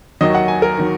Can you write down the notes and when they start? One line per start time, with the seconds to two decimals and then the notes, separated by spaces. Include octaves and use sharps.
0.21 D#2 D#3 F#3 D#5
0.35 F#5
0.48 G#5
0.62 A#4
0.78 D#3 F#3